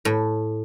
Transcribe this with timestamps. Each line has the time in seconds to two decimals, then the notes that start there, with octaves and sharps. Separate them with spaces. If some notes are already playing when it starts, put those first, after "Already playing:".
0.05 A2